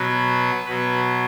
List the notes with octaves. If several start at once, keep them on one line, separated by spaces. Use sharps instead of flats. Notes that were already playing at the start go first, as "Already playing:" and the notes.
Already playing: B2 F#3 B4
B2 F#3 B4